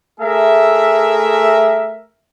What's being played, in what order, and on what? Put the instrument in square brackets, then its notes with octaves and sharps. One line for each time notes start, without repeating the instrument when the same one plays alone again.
[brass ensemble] A3 G#4 A#4 E5